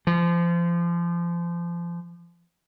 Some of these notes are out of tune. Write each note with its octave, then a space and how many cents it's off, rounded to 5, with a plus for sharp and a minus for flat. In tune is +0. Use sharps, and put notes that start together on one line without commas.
F3 -30